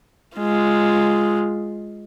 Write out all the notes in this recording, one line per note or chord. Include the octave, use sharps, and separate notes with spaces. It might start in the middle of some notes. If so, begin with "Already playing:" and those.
G#3 F4